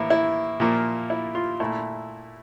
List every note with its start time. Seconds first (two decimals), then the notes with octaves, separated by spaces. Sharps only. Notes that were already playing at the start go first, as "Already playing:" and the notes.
Already playing: A2 E3 A#3 E4
0.10 E4
0.60 A#2 F3 A#3
1.10 E4
1.35 F4
1.60 A#2 A3 E4